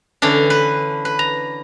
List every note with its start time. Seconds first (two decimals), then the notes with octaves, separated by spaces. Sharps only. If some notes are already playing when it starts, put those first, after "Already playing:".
0.22 D3 E3 C#4 D4
0.50 B4
1.05 B4
1.19 A#5